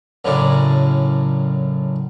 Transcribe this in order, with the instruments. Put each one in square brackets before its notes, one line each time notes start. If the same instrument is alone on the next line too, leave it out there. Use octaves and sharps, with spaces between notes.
[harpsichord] F#2 A2 C#3 D4